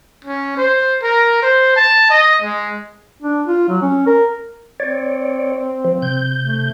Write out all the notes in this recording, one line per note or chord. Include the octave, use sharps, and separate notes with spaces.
C#4
C5
A#4
C5
A5
D#5
G#3
D4
F4
F#3
C#4
A#4
C4 C#5 D5
F3
C3 G6
A3